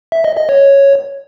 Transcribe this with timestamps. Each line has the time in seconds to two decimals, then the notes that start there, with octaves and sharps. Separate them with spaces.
0.12 E5
0.25 D#5
0.37 D#5
0.49 C#5